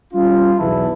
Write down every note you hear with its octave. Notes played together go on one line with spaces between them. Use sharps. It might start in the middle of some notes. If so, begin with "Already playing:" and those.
G3 C#4 F4
B1 E2 E3 E4 A5